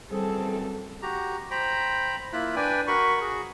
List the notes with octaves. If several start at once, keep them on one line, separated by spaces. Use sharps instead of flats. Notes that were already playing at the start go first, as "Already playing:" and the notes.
F#2 E3 G3 C4 G#4 A4
F#4 G4 A#5
C5 G5 A#5 B5
A#3 E4 F4 B5 F#6
D4 B4 D5 G5 G#5
F#4 A#4 B5 C#6
F#4 G#4